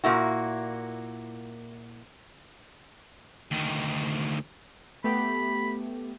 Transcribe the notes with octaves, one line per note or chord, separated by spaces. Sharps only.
A#2 A#3 E4 F#4
D2 D#3
A3 B3 G4 B5